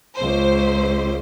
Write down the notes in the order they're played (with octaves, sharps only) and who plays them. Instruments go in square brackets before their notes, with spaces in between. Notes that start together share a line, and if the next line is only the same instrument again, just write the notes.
[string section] C#2 C5